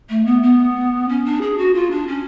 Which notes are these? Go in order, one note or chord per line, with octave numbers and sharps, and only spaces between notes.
A3
B3
B3
C#4
D4
G#4
F#4
F4
D4
C#4